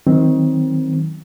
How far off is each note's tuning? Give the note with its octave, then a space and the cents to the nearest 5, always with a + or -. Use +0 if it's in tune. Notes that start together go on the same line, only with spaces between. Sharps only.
D#3 +25 F#3 +10 C4 +0